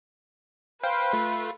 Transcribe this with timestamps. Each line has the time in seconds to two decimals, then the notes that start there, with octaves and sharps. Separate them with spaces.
0.83 B4 C5 F5 G5
1.13 A3 F4